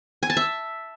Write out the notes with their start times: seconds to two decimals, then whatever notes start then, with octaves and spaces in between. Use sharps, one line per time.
0.23 G#5
0.30 A5
0.37 E5